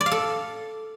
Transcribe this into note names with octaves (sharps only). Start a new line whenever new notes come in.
D5
F5
A4